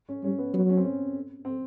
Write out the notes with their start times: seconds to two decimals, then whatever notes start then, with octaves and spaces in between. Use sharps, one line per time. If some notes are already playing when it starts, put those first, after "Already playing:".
0.09 C#4
0.24 G3 C#4
0.38 B3
0.54 F#3 B3
0.69 C#4
0.77 C4
0.85 C#4
1.45 C4